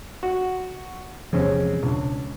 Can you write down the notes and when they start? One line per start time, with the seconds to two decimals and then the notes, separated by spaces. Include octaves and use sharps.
0.23 F#4
1.33 E2 C3 F3 G#3 C4 C#4
1.83 C#2 B2 D4